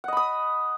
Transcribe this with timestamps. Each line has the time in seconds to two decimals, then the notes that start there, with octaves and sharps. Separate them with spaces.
0.04 F#5
0.08 D#5
0.13 B5
0.17 D#6